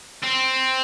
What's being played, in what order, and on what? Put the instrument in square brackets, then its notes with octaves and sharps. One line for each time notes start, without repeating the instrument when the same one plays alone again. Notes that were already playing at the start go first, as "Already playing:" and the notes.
[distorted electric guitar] C4